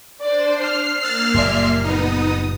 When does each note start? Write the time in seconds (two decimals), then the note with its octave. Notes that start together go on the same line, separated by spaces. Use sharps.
0.21 D4 C5 D5
0.60 F6 C7
1.02 A#3 E6 F#6 A6
1.34 F#1 A#2 G3 D5 E5 C6
1.84 B3 D#4 D#6